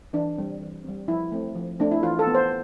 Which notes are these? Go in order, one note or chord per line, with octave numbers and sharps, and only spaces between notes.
E3 D4
G3 C4
E3
G3 C4
F3 E4
A3 C4
F3
A3 C4 D4
E4
E3 F4
A4
B3
C5